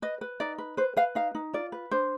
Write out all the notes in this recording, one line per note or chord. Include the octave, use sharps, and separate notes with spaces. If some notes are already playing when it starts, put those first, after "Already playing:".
B4 D#5
B4
D#4 D5
B4
B4 C5
B4 F5
D#4 F5
D#4
F4 D5
B4
D4 C5